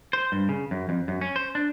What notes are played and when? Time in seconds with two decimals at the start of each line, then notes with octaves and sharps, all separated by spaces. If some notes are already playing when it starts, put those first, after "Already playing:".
0.13 C5
0.32 G2
0.49 C#3
0.71 F#2
0.89 F2
1.08 F#2
1.21 C#4
1.36 C5
1.55 D4